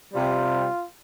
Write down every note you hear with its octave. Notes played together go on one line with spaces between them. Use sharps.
C3 G3 C4 F4